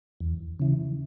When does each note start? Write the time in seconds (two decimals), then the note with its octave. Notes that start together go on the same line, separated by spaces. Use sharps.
0.20 E2
0.59 C#3 E3